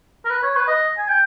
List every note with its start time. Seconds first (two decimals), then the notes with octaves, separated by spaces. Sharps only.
0.25 A#4
0.30 B4
0.43 C#5
0.56 B4
0.68 D#5
0.98 G#5
1.08 G5